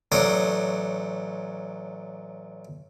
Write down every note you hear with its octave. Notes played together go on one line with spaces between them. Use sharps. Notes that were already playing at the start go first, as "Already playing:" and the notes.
A1 F#3 D4 A4 C5 D#6